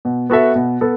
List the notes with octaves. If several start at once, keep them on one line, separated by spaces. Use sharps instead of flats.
B2
B3 F#4 A4 E5
B2
B3 A4